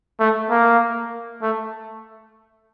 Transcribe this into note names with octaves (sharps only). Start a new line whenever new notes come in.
A3
A#3
A3